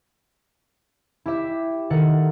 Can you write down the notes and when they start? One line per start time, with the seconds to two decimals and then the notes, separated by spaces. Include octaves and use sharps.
1.26 E4 G4 E5
1.90 D#3 A4 A#4 F#5